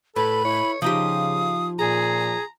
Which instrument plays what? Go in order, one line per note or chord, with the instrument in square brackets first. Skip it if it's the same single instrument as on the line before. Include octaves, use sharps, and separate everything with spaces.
[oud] A2 [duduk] A4 [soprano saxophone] B4 [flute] B5
[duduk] E4 [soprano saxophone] C#5
[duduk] C#3 [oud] F3 D#4 G4 [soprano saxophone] F5 [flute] D#6
[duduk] A#2 [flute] G#4 [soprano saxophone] A#5